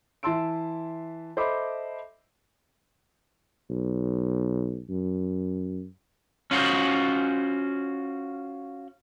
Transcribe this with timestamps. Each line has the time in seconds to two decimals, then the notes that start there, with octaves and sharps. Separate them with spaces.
0.23 E3 E5 A5 C6 E6 D7
1.37 A4 C5 D#5 E5 B5 D6
3.70 B1
4.90 F#2
6.51 C#4 F4 F#4 C5